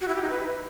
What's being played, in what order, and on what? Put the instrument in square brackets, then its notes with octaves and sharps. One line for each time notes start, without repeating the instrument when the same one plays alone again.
[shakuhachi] F#4
E4
G4
D#4
B4